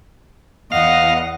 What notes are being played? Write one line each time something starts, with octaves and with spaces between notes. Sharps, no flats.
E2 D#5 F5 F#5